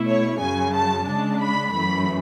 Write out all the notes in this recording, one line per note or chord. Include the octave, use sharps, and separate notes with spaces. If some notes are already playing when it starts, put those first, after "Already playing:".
Already playing: B2 A3 E4
C#5
F#2 C#3 F#3 G#5
A5
C#3 G#3 D4 A5
B5
F#2 E3 A3 B5